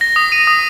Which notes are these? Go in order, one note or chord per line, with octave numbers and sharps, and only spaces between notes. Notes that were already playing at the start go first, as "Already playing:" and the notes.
A#6
D#6
D#7
D#6